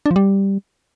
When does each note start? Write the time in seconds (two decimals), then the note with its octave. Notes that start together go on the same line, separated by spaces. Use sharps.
0.06 D4
0.11 F3
0.16 G3